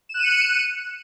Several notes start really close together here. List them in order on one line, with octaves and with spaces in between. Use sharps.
E7 F#6 D#7 C#7